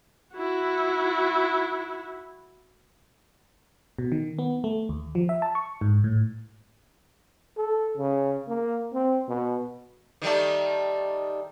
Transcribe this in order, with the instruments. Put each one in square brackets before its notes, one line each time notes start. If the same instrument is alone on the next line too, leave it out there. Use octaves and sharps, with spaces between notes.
[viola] E4 F#4
[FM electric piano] B2
D#3
B3
A3
D#2
F3
E5
A5
C#6
G#2
A2
[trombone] A4
C#3
A#3
C4
B2
[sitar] D#3 G3 A3